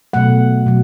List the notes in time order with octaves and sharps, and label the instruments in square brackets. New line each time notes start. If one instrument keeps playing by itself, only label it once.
[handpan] B2 F#3 A3 F#5
B2 F#3